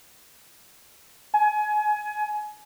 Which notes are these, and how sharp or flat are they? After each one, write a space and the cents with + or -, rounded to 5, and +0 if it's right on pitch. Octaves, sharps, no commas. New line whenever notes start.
G#5 +25